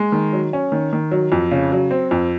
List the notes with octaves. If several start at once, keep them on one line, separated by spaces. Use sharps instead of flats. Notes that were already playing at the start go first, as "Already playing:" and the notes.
Already playing: G#3
D#3
F#3
C#4
D#3
D#3
F#3
F2
C#3
F#3
C4
F2